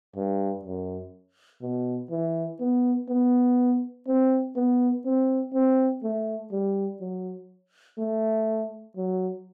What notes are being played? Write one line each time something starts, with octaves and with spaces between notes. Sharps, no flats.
G2
F#2
B2
E3
B3
B3
C4
B3
C4
C4
A3
G3
F#3
A3
F#3